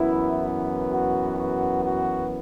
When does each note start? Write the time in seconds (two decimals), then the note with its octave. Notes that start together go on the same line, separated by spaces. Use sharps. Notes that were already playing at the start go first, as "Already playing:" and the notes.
Already playing: F#2 E3 B3 E4
0.90 F#4
1.37 F#4
1.84 F#4